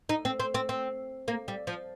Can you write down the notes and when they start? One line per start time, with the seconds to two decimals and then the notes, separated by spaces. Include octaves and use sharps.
0.09 D#4
0.25 C4
0.40 C4
0.54 C4
0.69 C4
1.28 A#3
1.48 G3
1.67 F3